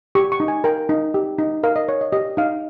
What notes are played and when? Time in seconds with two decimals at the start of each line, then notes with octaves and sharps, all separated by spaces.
0.15 G4 C#6
0.32 C#6
0.40 D#4
0.48 G#5
0.64 A#4 G5
0.89 D#4
1.14 G4
1.38 D#4
1.63 A#4 F5
1.76 D#5
1.88 C#5
2.01 D#5
2.12 G4 D#5
2.37 D#4 F5